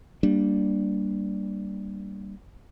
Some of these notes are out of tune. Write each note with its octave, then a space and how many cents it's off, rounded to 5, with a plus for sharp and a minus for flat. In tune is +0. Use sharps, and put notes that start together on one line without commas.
G3 +0 A#3 +0 D4 +0